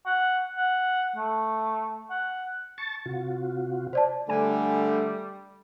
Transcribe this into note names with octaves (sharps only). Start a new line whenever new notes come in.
F#5
F#5
A3
F#5
A5 C#6 A6
C3 F4 F#4
C5 D5 A5
D3 G3 A3 G#5